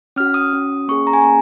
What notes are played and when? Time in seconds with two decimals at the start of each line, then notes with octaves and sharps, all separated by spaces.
0.16 C#4 F#4 F6
0.34 D#6
0.53 C#4 F#4
0.88 A#3 C#4 G#4 C#6
1.07 A#5
1.13 G#5
1.22 A#3 C#4 G#4 A#5